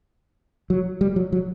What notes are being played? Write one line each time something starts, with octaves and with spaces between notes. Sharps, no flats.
F#3
G3
F#3
F#3